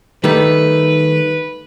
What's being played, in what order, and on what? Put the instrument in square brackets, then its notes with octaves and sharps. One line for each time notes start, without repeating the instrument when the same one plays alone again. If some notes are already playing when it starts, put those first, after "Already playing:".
[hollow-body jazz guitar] D#3 G3 A3 [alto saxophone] B4